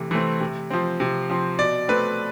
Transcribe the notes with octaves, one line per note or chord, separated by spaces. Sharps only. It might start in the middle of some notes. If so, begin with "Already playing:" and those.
Already playing: C3 E3 A3
E3 A3 C4
C3
F3 C4
C3
F3 C4
B2 D5
A3 C4 B4